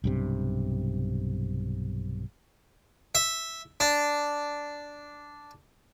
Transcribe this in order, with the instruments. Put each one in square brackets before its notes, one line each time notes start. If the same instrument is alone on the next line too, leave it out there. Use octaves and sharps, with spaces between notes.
[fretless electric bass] B1 G2 C3
[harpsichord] E5
D4